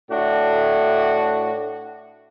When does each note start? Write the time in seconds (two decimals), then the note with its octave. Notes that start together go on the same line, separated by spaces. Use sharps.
0.10 A2 D4 F#4